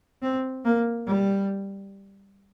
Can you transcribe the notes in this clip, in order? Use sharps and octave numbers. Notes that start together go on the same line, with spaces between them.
C4
A#3
G3